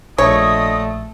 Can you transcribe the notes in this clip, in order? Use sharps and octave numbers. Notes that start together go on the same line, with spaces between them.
A#1 D3 A3 C#5 D#5 D#6